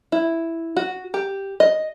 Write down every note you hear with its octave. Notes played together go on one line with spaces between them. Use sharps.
E4
F#4
G4
D#5